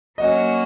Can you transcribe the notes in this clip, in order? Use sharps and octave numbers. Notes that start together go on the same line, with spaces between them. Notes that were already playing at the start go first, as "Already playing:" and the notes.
F#3 A#3 C#4 F#4 D#5